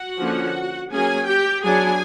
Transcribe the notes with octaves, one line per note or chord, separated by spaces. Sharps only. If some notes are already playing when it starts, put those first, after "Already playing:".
Already playing: F#4 F#5
D3 F3 A#3 C#4
F#3 A#3 C#4 G#4 G#5
G4 G5
F#3 B3 D4 G#4 G#5